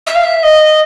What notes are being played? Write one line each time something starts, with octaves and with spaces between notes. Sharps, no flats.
E5
F5
E5
D#5